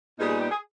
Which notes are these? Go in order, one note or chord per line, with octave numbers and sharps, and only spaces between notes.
A#2 G3 B3 D#4 G#4
G#4
G4
G#4